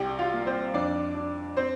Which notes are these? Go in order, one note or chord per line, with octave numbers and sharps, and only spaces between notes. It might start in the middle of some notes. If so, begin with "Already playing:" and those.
Already playing: C2 G4 G5
F4 F5
A#3
C4 C5
F2 D4 D5
D4
C4 C5